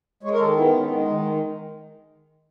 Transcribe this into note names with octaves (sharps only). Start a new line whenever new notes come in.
G#3 C#5
A#4
D#3 A4
B3 E4
D#3 C#4
G#3
D#3 D#4